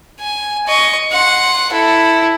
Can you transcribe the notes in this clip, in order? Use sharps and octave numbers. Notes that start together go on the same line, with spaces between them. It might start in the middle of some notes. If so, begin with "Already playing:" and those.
G#5
D#5 C#6
F#5 C6
E4 A4